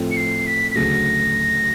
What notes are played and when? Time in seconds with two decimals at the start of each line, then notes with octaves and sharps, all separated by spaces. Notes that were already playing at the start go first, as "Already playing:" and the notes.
Already playing: A2 F3 A3 C4
0.11 C#7
0.17 C7
0.46 B6
0.71 B6
0.76 D2 C#3 F#3 A3 A#6